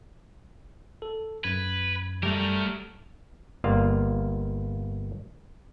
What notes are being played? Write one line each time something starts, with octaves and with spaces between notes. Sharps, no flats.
A4
F#2 B4 G#6
F#3 G3 A3 A#4
G1 A#3 F4 D5 F5